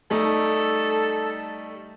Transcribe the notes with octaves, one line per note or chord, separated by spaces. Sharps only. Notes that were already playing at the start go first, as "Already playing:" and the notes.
G3 A3 D#4 A4